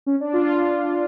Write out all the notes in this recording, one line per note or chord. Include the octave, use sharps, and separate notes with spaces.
C#4
D4
F4